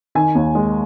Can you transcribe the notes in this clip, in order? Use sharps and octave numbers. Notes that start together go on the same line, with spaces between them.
D#3 G#5
D#2
G#3